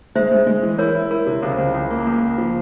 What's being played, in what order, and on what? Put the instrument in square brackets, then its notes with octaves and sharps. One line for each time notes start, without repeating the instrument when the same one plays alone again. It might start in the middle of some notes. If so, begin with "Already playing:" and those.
[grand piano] G#3 [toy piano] C5 E5
[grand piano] G#3
G#3
E3
[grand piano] E4 [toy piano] A#4 C#5
[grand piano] E4
[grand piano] E4 [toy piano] A#4
[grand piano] C3
[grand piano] C#2 [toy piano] C5
[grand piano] C#2
C#2
A#3
C#2
A#3
F3